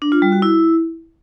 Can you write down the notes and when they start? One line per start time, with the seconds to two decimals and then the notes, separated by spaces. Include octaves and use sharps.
0.02 D4
0.12 F4
0.22 G3
0.32 F#4
0.42 E4